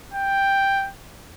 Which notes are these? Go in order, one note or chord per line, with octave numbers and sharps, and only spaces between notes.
G5